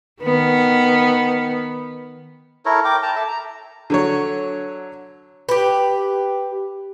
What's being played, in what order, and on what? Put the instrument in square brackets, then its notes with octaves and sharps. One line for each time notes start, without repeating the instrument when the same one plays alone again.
[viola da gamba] D#3 B3
[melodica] E4 A4 A#4 C#5
A#4 G5 D6
G5 A5 A#5
A4 E5
A#5
[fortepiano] D3 F#3 C#5
[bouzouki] G4 B4